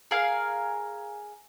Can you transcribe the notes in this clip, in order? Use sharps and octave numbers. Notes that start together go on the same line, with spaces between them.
G#4 A#4 F5 G#5